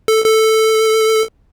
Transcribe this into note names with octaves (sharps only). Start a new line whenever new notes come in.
A4
A4